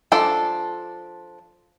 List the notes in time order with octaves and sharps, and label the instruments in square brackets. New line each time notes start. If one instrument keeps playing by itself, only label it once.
[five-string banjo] F3 D4 A4 D5